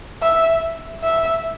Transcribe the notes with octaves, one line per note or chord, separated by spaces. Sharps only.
E5
E5